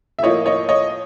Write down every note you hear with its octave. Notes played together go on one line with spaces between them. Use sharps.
E5
A2 F3 A#3 C#5 D#5
C#5 D#5
C#5 D#5